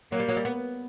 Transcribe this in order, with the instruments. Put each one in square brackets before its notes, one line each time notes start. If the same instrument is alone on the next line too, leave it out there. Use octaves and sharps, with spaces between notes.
[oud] F#3 [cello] A#3
[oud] G3
F#3
G3
B3